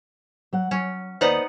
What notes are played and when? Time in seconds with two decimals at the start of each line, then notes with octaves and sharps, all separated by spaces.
0.53 F#3 F#5
0.71 F#3 C#4
1.21 D#2 B3 D#4 B4 C5 D5 F#5